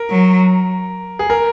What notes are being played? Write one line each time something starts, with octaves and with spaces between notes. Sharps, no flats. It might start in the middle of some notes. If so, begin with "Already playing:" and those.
Already playing: A#4
F#3
G#4
A#4